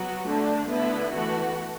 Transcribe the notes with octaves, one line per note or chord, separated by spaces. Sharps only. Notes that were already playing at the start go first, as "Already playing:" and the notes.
Already playing: F#3 B3 F#4
D3 A3 D4
D3 B3 E4
E3 A3 F#4